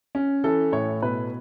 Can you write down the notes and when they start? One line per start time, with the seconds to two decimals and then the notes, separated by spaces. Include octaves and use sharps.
0.15 C#4
0.44 E3 A4
0.72 A2 C#5
1.02 B2 B4